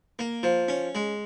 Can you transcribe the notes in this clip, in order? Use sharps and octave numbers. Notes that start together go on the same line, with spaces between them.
A#3
F3
C#4
G#3